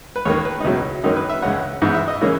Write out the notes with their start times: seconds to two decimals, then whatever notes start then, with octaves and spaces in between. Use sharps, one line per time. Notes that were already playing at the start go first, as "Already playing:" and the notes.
0.16 B4
0.25 D#2 D#3 A#3 C#5
0.45 B4
0.60 D#4
0.64 C#2 B2 F#3 E4
1.04 F#2 D#3 A#3 C#4 D#4
1.16 B4
1.29 E5
1.42 C#2 C#3 G#3 C#4 F#5
1.82 G#2 E3 B3
1.95 E5
2.08 D#5
2.21 C#3 E3 A#3 C#4